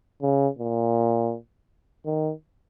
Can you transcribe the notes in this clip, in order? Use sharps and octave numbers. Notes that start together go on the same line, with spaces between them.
C#3
A#2
D#3